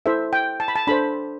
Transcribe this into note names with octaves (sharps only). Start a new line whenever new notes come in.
E4 A4 C5 E5
G5
A5
B5
A5
D4 A4 C5 B5